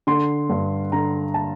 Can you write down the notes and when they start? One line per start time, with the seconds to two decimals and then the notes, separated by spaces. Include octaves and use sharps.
0.07 D3 C6
0.49 G2
0.92 D3 A#5
1.34 A5